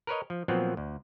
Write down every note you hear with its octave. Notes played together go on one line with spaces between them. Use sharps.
A#4 B4 C#5 D#5
F3
A#2 F3 F#3 B3 C4
D2